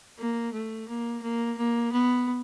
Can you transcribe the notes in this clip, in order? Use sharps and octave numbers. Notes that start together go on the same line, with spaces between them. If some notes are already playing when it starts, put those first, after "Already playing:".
A#3
A3
A#3
A#3
A#3
B3